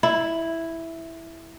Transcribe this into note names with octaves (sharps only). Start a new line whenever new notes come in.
E4